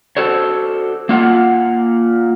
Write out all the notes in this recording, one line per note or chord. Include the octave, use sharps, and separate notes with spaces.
F#4 A4 C5 C#5
A#3 F4 F#5